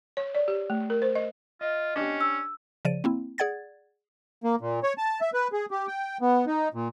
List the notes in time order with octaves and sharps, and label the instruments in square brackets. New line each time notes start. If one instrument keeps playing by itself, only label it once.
[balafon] C#5
D5
G4
A3
A#4
C5
D#5
[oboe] F4 [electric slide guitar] D#5
[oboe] C#4 [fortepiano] D4 G4
[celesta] E6
[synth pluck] C#3 F3 D5 D#7
A#3 C4 E4
G#4 D5 F#5 G#6 A6
[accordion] A#3
A#2
C#5
A5
E5
B4
G#4
G4
G5
B3
D#4
A#2